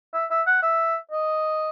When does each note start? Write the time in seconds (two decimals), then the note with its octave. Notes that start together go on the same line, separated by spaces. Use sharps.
0.14 E5
0.31 E5
0.47 F#5
0.63 E5
1.11 D#5